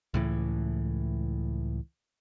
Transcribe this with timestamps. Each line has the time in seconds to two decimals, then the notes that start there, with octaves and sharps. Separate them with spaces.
0.14 C#2 A2 E3